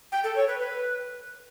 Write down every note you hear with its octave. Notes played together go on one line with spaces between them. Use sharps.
G5
A4
C#5
B4
B4